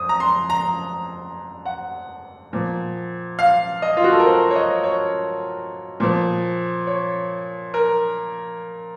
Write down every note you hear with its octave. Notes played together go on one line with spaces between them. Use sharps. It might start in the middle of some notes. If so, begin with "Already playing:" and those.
Already playing: F2 D#6
A#5
C6
A#5
F#5
A#2 F3
F5
D#5
F4
F#4
A4
A#4
C5
C#5
D#5
C#5
A#2 F3
C#5
A#4